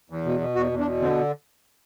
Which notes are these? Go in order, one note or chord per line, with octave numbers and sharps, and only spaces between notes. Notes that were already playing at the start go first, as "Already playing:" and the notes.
E2
B2
B2
E2 F#4
E2
D4
B2
D3 C4